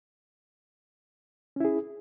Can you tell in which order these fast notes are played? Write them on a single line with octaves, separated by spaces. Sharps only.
C#4 E4 G#4